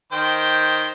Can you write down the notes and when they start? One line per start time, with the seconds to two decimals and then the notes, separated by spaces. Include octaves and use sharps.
0.13 D#3 C5 G5